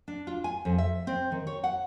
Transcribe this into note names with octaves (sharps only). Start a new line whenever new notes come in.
D4
F4
G#5
F2
E5
C4
D#3
C#5
F#5